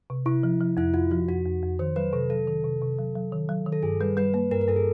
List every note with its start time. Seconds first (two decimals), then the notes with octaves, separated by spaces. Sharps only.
0.10 C3
0.26 C3 E4
0.43 F3
0.61 F3
0.77 F2 E4
0.94 F2 F4
1.11 F3 F#4
1.28 F2 F#4
1.46 F2
1.63 F2
1.79 D#3 C5
1.96 F#3 B4
2.13 C3 A4
2.30 F#3 A4
2.47 D#3
2.64 C3
2.82 C3
2.99 F#3
3.15 F#3
3.33 D#3
3.49 F#3
3.66 D#3
3.72 A4
3.83 G2 G#4
4.01 G3 B4
4.17 G3 B4
4.33 A#3 B4
4.51 G2 A#4
4.61 A#4
4.68 G2 A4
4.76 G#4